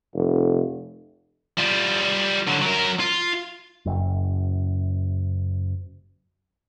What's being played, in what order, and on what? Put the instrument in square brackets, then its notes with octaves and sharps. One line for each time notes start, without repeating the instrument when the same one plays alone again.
[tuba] F1
[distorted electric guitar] G3 F4
D3 F#3
F#3 A#4
F4
[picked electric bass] F#1 F#2